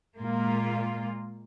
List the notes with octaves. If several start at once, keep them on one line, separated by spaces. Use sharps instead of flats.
A#2 G#3 A#3 F4